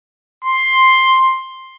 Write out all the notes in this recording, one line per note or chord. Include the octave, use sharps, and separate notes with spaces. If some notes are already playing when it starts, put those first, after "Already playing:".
C6